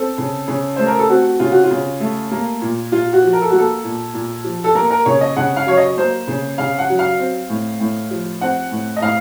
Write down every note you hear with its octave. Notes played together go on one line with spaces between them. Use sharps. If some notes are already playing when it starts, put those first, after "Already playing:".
Already playing: C4 A4
C#3
C#3
A3 C5
A#4
A4
C4 F#4
C#3 F4
F#4
F4
C#3
A3
A#3
A#2
A#2 F4
F#4
F3
A#4
A4
F#4
A#3 A4
A#2
A#2
F3
A4
A#3 A#4
A#4
C#3 C#5
D#5
C#3 F#5
F5
F#3 C#5
D#5
A#3 C5
C#3
C#3 F5
F#5
F#3
F5
C4
A2
A2
F3
C4 F#5
A2
D#5
A2 F5